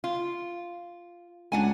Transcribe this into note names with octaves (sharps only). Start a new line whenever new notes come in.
F4
C#2 D4 F#5 G#5